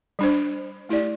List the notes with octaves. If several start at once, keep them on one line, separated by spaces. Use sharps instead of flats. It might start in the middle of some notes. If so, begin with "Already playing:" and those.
G3 D4 C5
A3 E4 G4 D5